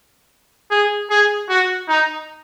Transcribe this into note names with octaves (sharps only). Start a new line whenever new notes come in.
G#4
G#4
F#4
D#4